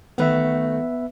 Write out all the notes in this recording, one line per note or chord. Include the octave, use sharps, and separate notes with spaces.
D#3 A3 B3 F#4 B4 E5